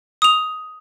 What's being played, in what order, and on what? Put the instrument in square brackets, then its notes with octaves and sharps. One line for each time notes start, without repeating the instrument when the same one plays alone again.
[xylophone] D#6 F7